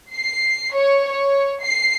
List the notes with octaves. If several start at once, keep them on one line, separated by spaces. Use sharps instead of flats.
C7
C#5
C#5
C7